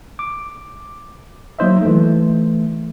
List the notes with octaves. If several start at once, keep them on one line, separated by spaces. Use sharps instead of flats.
D6
F#3 A#3 D#4 C5 D#5 E5
E3 A3